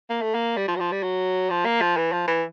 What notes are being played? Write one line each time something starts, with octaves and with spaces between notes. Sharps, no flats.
A#3
A3
A#3
G3
F3
F#3
F3
G3
F#3
F3
A#3
F3
E3
F3
E3